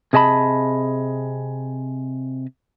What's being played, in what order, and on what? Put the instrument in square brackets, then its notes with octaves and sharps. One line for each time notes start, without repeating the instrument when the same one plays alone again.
[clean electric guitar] C3 G#4 D#5 A5 B5